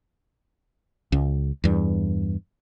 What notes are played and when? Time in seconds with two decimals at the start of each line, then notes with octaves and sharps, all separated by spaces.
1.12 C#2
1.64 E2 G2